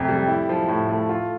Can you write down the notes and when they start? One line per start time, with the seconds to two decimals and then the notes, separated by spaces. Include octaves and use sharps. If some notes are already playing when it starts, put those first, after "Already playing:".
Already playing: F2 C3
0.09 G3
0.28 E4
0.49 F3
0.68 A2
0.89 A3
1.09 F4